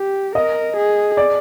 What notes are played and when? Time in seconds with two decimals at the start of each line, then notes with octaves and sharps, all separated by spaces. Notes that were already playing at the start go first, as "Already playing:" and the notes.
Already playing: G4
0.35 A#4 D#5
0.76 G#4
1.17 D5